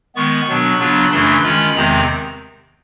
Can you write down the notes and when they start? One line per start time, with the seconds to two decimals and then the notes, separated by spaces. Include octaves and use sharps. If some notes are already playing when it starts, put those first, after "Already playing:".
0.16 D#3 G#3 B3 C#6
0.48 B2 F#3 B3 D4
0.80 C#3 F#3 B3 D4 F4
1.11 F#2 C#3 E3 A3 D4 C6
1.43 D#3 G#3 C#4 F4 B5
1.75 E2 C3 D#3 G#3 C4 A#5